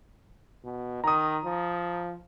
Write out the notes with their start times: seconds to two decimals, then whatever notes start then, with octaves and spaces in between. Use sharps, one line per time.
0.64 B2
1.04 D#3 A#5 D#6
1.44 F3